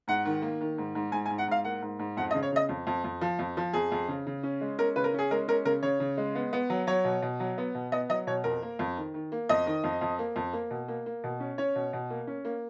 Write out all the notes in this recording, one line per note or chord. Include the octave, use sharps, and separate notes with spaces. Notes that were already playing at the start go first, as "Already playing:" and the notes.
G#2 F#5
D#3
A#3
D#3
G#2
G#2
G#2 G#5
G#5
G#2
F#5
G#2 F5
A#3 F#5
G#2
G#2
F2 F#5
D#5
C#3
C#5
C#3 D#5
F2
F2
F2
F3
F2
F3
F2 G#4
F2
C#3
C#3
C#4
G#3
C#4 A#4
C#3 B4
A#4
C#4 G#4
G#3 A#4
C#4 A#4
C#3 A#4
C#3 C#5
C#3
G#3
B3
B3
F#3
F#3 C#5
B2
B2
F#3
B3
B2
B3 D#5
F#3 D#5
B2 C#5
F2 A#4
A#3
F2
D#3
D#3
A#3
F2 D#5
D#3
F2
F2
A#3
F2
A#3
B2
A#3
A#3
B2
C#4
C#4 C#5
B2
B2
A#3
C#4
A#3